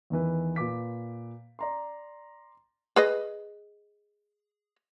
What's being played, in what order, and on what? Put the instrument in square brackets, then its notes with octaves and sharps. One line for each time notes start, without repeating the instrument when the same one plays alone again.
[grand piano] E2 D#3 E3 B4
A#2 B4 D6 B6
D5 A#5 C6
[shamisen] G#4 B4 D#5